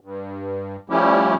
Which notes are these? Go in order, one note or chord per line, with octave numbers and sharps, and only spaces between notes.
G2
F3 G3 A3 C#4 E4 G4